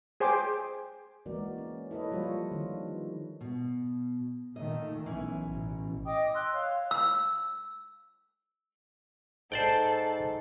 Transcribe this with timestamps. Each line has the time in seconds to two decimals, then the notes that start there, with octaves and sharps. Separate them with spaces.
0.20 G#4 C5 G5 G#5 D6
1.26 E3 G#3 A#3 F#4 A#4 D5
1.58 C#4
1.91 E4 A4 B4 C#5 D#5
2.11 F3 G3 A#3 F4 C5 C#5
2.51 D3 D#3
2.88 B4
3.41 B2
4.56 A#2 D#3 A3 D#5
5.06 B1 E3 C#4
5.49 A1 B2
6.05 D#5 G5 D6 D#6
6.35 C6 E6 F#6
6.53 C#5 F5
6.91 E6
9.52 G#2 A4 C5 D5 G5